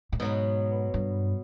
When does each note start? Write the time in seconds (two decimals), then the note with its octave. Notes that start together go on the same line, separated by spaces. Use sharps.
0.12 A2
0.20 G#2 B2 F#3 B3
0.94 G2